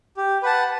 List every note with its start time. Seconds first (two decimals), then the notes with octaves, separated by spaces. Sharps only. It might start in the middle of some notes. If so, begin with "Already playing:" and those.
0.17 G4
0.43 B4 F#5 A5